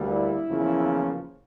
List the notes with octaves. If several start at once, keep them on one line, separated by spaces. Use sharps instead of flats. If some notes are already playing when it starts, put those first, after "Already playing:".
Already playing: D2 D3 G3 A#3
E4
E2 C#3 F3 A#3